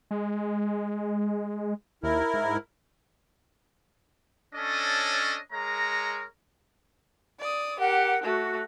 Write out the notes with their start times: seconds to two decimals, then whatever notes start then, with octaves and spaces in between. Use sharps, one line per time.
0.11 G#3
2.03 D#2 E4 A#4
2.34 G#2
4.55 C#4 D4 A4 C#5 D#5
5.52 G#3 A#4 C#5 A#5
7.40 D5 D#6
7.80 G4 A#4 F#5
8.24 A3 F#4